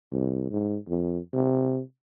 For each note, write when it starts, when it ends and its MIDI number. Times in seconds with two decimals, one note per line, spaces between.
0.12 0.47 36
0.51 0.78 44
0.87 1.18 41
1.33 1.80 48